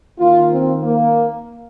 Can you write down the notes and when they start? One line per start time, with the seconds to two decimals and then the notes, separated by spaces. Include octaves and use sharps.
0.19 D#3 A#3 F4
0.52 C4
0.83 A#3